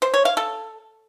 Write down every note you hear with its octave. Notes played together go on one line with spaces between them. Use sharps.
C5
C#5
F5
A4